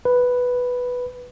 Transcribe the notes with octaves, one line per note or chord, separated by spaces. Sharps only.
B4